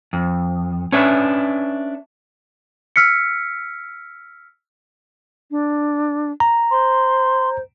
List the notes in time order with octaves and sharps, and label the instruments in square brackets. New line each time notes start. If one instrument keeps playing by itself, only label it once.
[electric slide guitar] F2
C#4 D4 B4 E5
[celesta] E6 F6 B6 C#7
[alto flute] D4
[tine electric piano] A#5
[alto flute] C5 [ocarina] C6